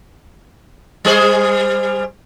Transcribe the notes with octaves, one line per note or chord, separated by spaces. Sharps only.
G3 G#4 C5